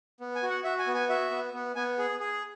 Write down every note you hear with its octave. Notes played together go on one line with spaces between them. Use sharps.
B3
G#5
F#4
F#5
F#4 E5
G#5
B3
G#5
F#4 E5
B3
B3
B3 G#5
G#4
G#4